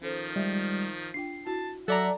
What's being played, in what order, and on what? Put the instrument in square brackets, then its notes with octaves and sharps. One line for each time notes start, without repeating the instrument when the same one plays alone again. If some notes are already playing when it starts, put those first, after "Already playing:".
[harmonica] D#3 F3 [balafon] C#4 A4 C5
[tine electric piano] G3 G#3 [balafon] E5
[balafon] D4 F4 G5 [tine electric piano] C7
[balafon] E4 F#4 [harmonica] A5
[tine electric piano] F#3 [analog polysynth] A4 D5 A#5 [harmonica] E5 F#5